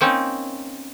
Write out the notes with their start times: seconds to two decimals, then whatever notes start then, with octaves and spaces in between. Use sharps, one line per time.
0.01 A#3 C4 C#4 D#4